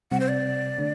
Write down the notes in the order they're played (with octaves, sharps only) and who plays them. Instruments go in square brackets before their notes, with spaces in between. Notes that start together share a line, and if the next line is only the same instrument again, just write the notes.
[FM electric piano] C3 G3 C4 [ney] F#5
[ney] C5
D5
[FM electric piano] D3 A3 D4